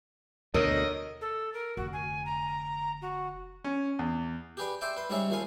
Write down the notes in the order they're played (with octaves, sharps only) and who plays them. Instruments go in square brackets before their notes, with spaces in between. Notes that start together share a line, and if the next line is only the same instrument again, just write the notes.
[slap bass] D2 B2 [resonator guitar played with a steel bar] A#4 [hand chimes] C#5 E6 F6 [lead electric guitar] D#5
[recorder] A4
A#4
[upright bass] F1 D3 [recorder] F#4
[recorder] G#5
A#5
F#4
[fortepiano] C#4
E2
[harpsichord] G4 G#4 B4 D5
C5 D5 E5 G5
B4 C6
G#2 C#3 G3 G#4 C#5 E5
D#2 F3 G#4 F5 G#5